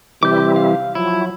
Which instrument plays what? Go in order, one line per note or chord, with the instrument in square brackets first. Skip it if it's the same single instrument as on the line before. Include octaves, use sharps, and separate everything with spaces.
[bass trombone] C3 [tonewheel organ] E3 G3 E4 [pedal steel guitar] D6 G6
[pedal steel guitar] F5
[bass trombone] F3 [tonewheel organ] F#3 [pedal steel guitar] E4